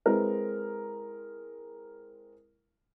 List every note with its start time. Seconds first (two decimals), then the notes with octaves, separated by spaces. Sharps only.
0.06 G#3 C4 E4 A#4 B4